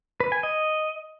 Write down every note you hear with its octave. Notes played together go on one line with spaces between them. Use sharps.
B4
G#5
D#5